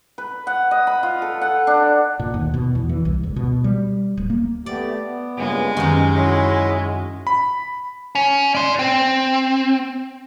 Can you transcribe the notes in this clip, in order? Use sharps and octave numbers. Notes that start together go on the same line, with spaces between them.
B4
F#5
D#5
B5
F4
A4
F#5
D4
A#2
D#2
B2
E2
E3
C2
C#2
B2
G3
D1
A#3
A3 B3 G4 D5
B3
G2 A#2 C#3 G#3
F#2 C3 D#3 C#6
E4 F#4 C#5 D#5 E5 C6
B5
C#4
D5 C6
C4